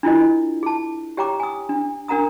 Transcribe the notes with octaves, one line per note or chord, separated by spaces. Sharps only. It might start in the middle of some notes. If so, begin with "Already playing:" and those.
D4 E4 F4 A#4 D#5
G#4 A5
G4 C#5 G5 A#5 D6
G#5 D#6
D4
D4 A#4 F#5 A#5 D#6